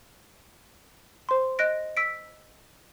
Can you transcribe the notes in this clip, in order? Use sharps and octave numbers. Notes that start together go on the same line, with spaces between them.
C5 C6
D#5 F#6 A#6 D7
E6 B6 D7